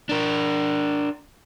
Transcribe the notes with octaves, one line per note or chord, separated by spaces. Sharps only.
D4 A#4